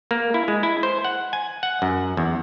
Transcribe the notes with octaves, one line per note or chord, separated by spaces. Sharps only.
A#3
E4
G#3
E4
C5
F#5
G#5
F#5
F#2
E2